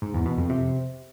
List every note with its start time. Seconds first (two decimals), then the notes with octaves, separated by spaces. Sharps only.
0.02 G#2
0.14 E2
0.26 B2
0.38 F2
0.49 C3